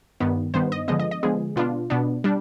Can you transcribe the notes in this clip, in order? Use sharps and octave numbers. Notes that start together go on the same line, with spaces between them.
G2 D#3 B3
G2 D#3 B3 C5
D#5
D3 F3 G#3 B3 D#5
D#5
D#5
D3 F3 G#3 B3 G#4
B2 B3 D4 F4
B2 B3 D4
G3 D4